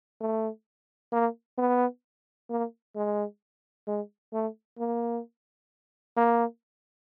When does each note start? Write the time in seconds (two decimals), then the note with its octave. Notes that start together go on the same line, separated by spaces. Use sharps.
0.21 A3
1.12 A#3
1.58 B3
2.50 A#3
2.96 G#3
3.87 G#3
4.33 A3
4.78 A#3
6.17 A#3